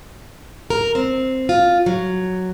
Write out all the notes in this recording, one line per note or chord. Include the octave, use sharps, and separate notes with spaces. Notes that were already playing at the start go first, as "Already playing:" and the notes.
A#4
C4
F4
F#3